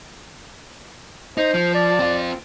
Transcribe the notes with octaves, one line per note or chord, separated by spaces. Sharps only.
D#4 C5
F3
D5
C4 F4